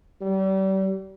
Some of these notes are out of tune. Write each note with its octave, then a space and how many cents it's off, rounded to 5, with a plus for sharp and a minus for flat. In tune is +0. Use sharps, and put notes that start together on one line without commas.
G3 -35